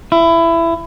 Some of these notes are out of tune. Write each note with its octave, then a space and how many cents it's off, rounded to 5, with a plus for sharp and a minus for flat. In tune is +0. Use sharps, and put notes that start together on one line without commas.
E4 +20